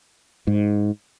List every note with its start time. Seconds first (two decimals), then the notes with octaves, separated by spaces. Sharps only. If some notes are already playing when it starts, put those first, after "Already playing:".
0.47 G#2